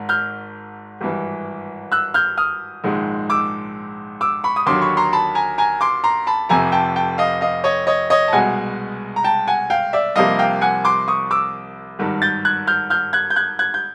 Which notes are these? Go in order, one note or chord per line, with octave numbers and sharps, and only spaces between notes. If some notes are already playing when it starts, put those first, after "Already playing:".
Already playing: G#1 G#2
F6 G6
G#1 G2 E3
E6 F#6
F6 G6
D#6 F6
A#1 G#2 D#3 G#3
D6 E6
D6 E6
B5 C#6
D#6
D#2 D3 F#3 C6 D6
B5 C#6
A#5 C6
A5 B5
G#5 A#5
G#5 A#5
C6 D6
A#5 C6
A5 B5
F1 F2 C3 G#5 A#5
G5 A5
G5 A5
D#5 F5
D#5 F5
C#5 D#5
C#5 D#5
C#5 D#5
A5
C2 B2 G#3 F#5 G#5
A#5
G5 A5
F#5 G#5
F5 G5
D5 E5
C2 C3 F3 A#3 D#5 F5
F5 G5
F#5 G#5
C6 D6
C#6 D#6
D6 E6
G#1 G2 D#3
G6 A6
F#6 G#6
F6 G6
F6 G6
F#6 G#6
G6
F#6 G#6
F#6 G#6
G6